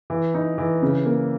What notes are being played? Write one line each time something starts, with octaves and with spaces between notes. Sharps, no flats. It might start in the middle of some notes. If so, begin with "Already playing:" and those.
E3
D#4
E3
C#3
A#3